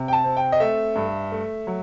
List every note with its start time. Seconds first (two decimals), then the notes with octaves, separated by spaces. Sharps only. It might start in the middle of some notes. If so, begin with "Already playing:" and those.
Already playing: C3
0.08 G5
0.13 A5
0.24 C4
0.37 G5
0.52 D#5
0.60 A3 E5
0.96 G2
1.32 A3
1.67 F#3